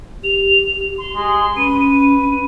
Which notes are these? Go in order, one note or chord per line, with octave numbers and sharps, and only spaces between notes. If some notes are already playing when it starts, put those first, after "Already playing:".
G4 F7
C6
G#3
C#4 B4 D#7
D#7